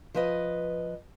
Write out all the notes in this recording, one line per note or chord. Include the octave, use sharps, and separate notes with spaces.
F3 B4 D#5